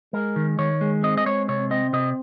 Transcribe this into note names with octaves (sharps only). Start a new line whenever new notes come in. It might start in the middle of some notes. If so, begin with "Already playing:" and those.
G#3 A#4
D#3
D#3 C#5
G#3
C4 D#5
D#5
G#3 C#5
C3 C#5
C4 D#5
C3 D#5